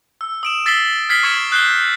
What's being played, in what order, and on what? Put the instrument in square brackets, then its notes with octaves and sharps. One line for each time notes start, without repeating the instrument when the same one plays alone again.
[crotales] E6
D#6 D7 E7
E6 A6 B6 C7 F#7 G7
F6 G#6 B6 C7 F#7 G7
C#6 D#6 G#6 C7 C#7 E7
D#6 F#6 G6 C7 E7 G7